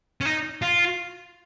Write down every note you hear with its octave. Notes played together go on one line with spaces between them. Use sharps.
C#4
D#4
F4